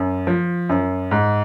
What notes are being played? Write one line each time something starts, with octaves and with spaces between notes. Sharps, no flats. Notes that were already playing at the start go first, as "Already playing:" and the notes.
Already playing: F#2
F3
F#2
G#2